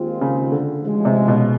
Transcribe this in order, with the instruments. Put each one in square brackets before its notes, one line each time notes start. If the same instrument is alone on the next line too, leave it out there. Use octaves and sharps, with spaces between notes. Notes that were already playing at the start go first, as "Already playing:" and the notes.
Already playing: [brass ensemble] D#2 D#3 G#3 C4 F4
[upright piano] C#3
D3
[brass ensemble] A1 G#2 F3 G#3 C#4
[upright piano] C3
B2